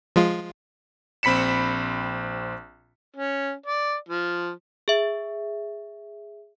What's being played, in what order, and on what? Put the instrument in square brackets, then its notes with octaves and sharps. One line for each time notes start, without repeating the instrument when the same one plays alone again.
[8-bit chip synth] F3 G#3 F4
[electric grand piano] A#1 C4 B5 B6 C#7 E7
[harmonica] C#4
D5
F3
[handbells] G#4 E5